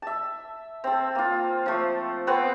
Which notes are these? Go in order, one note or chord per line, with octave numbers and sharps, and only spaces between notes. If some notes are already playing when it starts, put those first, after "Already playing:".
E5 A5
C4 A4
A#3 F4
F3 A3
B3 C4 C5 F#5